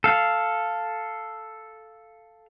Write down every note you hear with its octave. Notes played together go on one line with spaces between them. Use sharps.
A4 F5